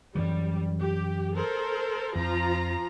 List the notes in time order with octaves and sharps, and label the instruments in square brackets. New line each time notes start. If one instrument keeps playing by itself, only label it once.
[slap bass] F#2 E3 F#3 [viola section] G3
[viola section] G4
A4 A#4 C5
[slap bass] F2 [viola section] F3 F4 A#5